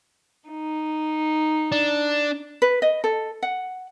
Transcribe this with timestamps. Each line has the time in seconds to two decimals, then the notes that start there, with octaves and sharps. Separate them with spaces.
0.49 D#4
1.72 D4
2.62 B4
2.82 D#5
3.04 A4
3.43 F#5